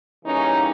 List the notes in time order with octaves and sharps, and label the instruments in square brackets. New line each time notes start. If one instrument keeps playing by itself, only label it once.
[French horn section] C#3 E3 G3 A#3 C#4 D#4